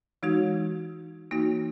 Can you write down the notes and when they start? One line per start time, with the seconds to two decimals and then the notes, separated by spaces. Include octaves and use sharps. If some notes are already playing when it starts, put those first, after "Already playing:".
0.23 E3 G#3 D#4 F#4
1.31 E3 A#3 D#4 F#4